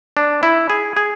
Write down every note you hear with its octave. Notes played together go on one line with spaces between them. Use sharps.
D4
E4
G#4
G#4